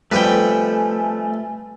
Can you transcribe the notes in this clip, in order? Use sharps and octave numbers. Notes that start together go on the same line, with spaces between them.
F2 G3 A3 B3 B4 G5 G#5